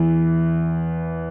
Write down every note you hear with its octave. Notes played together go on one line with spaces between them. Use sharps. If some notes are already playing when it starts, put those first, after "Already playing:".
Already playing: E2 E3